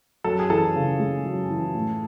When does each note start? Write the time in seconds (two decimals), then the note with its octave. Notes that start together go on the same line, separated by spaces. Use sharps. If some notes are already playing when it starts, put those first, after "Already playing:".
0.24 F#2 A4
0.39 G#4
0.50 E3 A4
0.75 C#3
1.00 G#3
1.25 F#2
1.50 E3
1.75 A2